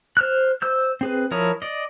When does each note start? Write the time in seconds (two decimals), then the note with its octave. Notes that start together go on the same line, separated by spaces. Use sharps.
0.17 C5 F6 F#6
0.62 C5 E6 G6
1.01 C4 G#4 B4
1.31 F3 E4 A#4 C#5 D#6
1.62 D5 D#5